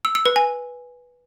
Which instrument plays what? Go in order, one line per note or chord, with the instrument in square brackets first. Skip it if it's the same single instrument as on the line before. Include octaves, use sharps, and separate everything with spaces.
[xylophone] E6
E6
B4
G#5